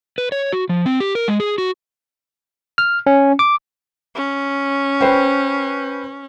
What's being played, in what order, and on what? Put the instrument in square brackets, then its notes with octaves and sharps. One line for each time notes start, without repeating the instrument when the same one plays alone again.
[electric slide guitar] B4
C#5
F#4
F3
C4
G4
A#4
G#3
G#4
F#4
[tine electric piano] F6
C#4
D6
[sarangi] C#4
[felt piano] B4 C5 G5